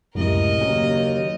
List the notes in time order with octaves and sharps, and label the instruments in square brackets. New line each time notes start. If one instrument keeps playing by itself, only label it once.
[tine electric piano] C#2 A2 C3 [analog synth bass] F#2 [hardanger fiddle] A#4 D#5
[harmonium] D#2 [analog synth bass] C#3 [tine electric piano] F#3